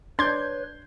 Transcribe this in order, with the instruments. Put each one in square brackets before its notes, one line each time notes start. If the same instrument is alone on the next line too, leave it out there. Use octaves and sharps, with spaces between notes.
[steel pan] D4 D5 [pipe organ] B4 C#5 [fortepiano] C6 [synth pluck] G6 G#6